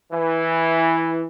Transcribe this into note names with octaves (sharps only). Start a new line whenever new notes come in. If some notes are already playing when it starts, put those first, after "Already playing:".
E3